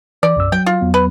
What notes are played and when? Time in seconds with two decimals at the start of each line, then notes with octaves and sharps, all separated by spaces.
0.23 E3 D5
0.36 B1 F#2 E6
0.52 F#3 G5
0.66 F4
0.81 E2 F#3 B3
0.94 B4